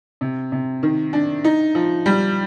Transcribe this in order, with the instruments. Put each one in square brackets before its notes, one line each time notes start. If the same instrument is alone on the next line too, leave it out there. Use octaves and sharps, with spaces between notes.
[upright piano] C3
C3
D#3
D4
D#4
F3
G3